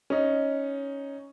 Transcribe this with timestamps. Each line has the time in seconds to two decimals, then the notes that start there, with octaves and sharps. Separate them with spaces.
0.10 C#4 D#4